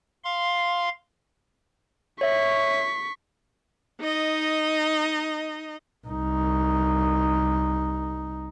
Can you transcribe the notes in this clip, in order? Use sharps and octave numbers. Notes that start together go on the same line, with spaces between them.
F5 C6
C#5 E5 C#6 B6
D#4 D#5
C2 D#4